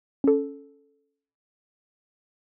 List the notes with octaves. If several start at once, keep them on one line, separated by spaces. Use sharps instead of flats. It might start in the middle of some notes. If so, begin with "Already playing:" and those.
C#4 A4